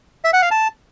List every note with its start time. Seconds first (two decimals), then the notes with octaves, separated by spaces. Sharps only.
0.24 E5
0.33 F#5
0.42 F5
0.51 A5